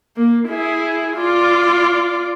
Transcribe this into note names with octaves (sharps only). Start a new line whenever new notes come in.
A#3
E4 G#4
F4 D5